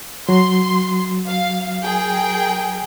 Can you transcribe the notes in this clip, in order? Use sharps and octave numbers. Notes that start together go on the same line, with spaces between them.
F#3 F#4 C6
F5
G#4 A#4 G5